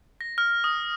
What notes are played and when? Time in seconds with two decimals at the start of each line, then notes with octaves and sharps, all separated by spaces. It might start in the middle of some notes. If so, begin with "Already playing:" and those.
0.21 A#6
0.38 F6
0.64 D#6